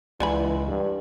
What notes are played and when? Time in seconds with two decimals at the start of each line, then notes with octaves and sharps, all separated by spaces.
0.20 C#2 D3 E3 G#5 B5
0.68 G2